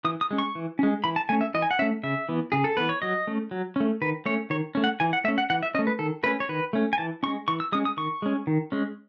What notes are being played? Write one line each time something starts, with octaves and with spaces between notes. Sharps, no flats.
E3 D#6
D#6
G#3 C#4
C#6
E3
G#3 C#4
E3 B5
A5
A3 C#4 G#5
E5
E3 D#5
G#5
F#5
A3 C#4 E5
C#3 E5
E3 B3
C#3 G#4
A4
E3 B3 B4
C#5
F#3 D#5
A3 C#4
F#3
A3 C#4
D#3 B4
A3 C#4 C#5
D#3 C#5
A3 C#4
F#5
E3 G#5
F#5
A3 C#4 E5
F#5
E3 F#5
E5
A3 C#4 D#5
B4
D#3 A4
A3 C#4 B4
C#5
D#3 B4
A3 C#4
G#5
E3 A5
G#3 C#4 C#6
E3 C#6
E6
G#3 C#4 D#6
D#6
D#3 C#6
G#3 C#4
D#3
G#3 C#4